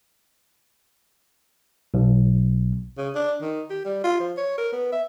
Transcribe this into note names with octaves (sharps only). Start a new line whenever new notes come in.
B1
C#3
D4
D#3
G4
G3
F4
F3
C#5
A#4
B3
E5